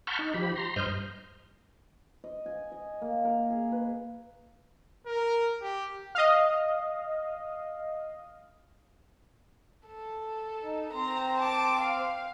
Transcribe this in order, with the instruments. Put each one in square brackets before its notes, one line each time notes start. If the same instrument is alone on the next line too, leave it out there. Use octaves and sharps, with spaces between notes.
[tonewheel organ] F#5 A5 B5 C#6 F6 G6
D#4
F3 G4 B5
A#5 C6
G2 C5 D#5 F6 G6
[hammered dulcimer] D#5
G#5
D#5
A#3
A#4
G#4
B4
[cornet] A#4
G4
[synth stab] D#5 F5
[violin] A4
[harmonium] D#4
[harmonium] C4 C5 [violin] A#5
[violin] A5 D6
F5